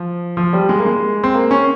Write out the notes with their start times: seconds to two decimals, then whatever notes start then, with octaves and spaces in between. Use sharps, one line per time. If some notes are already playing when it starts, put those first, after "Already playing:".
Already playing: F3
0.37 F3
0.53 G3
0.69 G#3
0.78 A#3
0.86 G#3
1.23 C4
1.34 A#3
1.51 C#4